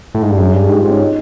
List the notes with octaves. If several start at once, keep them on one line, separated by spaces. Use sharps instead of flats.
A2
G#2
G2
F#2 G#4
G2 G#4
G#2 G4
F4
G#2
C#4
D#4